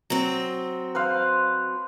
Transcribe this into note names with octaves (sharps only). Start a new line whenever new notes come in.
F#3 C4
B4 C5 F5